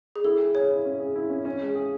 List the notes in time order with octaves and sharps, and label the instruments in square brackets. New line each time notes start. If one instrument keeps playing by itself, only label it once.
[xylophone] G#4
[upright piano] E4 [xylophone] A4
[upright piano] G#4
[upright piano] G#4 [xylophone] C#5
[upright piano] E4
C#4
G#4
E4
C#4
C#4
G#3
G#4